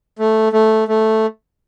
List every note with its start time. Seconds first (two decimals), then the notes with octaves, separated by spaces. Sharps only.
0.19 A3
0.53 A3
0.88 A3